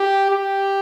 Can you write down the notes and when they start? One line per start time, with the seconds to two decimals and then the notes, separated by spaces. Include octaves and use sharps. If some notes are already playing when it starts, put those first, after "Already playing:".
Already playing: G4
0.31 G4